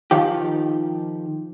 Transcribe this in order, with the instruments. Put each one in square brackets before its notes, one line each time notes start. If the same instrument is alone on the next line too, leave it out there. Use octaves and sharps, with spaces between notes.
[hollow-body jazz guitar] D#3 F3 G4